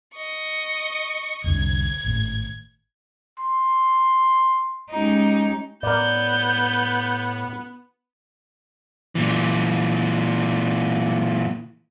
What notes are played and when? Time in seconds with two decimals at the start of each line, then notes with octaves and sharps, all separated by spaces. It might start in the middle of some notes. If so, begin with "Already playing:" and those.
0.14 D#5 C#6
1.44 F1 C2 D3 G#6
2.04 G#1 A2
3.39 C6
4.91 G#3 C#4 D#4 G4
5.83 A2 B3 A#4 D5 G6
9.15 A#2 E3